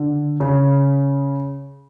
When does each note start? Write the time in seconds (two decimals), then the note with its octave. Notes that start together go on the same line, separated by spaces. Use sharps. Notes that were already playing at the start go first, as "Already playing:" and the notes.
Already playing: D3
0.40 C#3